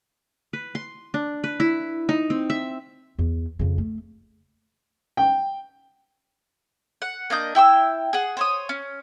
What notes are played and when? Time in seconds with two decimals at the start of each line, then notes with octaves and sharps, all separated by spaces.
0.53 B4
0.75 C6
1.14 D4
1.44 B4
1.60 E4
2.09 D#4
2.30 C4
2.50 E5
3.19 E2
3.59 F2 C#3
3.78 A3
5.17 G5
7.02 F#5
7.30 A#3 D4 D#5 G6
7.55 E4 G5 C#6 E6
8.13 G#4 F#5
8.37 C5 C#5 D#6
8.69 C#4